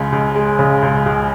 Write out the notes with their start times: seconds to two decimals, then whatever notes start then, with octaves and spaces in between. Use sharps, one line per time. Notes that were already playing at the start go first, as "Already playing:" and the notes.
Already playing: C#2 C#3 G#3
0.12 C#2
0.35 G#3
0.59 C#3
0.82 C#2
1.06 C#2